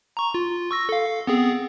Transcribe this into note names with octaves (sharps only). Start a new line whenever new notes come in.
A#5 C#6
F4
C#6 E6 A#6
A4 F5
B3 C4 G#4